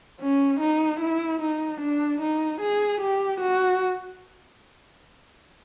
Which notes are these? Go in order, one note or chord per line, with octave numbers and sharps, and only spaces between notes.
C#4
D#4
E4
D#4
D4
D#4
G#4
G4
F#4